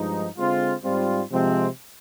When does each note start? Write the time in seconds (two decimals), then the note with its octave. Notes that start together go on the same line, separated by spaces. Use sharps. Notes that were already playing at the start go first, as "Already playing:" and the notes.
Already playing: G2 F3 G#3 D#4
0.37 D3 G#3 C4 F4
0.84 G#2 G3 C4 F4
1.31 C3 F3 G#3 C4